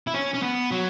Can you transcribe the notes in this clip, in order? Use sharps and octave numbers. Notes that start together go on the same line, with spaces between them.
E4
C#4
C#4
B3
F#3